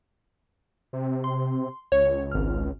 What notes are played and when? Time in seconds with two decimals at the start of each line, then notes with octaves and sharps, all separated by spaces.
0.93 C3
1.24 C6
1.92 C#2 C#5
2.32 G#1 F6